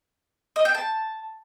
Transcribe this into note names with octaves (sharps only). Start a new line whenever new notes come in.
D#5
G5
A5